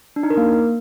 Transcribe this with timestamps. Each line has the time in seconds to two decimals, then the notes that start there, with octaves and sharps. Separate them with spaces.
0.16 D4
0.23 D#4
0.30 A#4
0.37 A#3